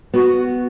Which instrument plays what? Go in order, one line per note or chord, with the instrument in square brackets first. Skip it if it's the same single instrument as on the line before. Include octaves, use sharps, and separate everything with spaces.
[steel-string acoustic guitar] B3 [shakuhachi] F#4